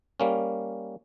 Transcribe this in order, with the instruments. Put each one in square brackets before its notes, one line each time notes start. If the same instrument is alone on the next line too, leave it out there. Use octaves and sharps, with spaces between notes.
[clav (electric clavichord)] G3 A#3 C#4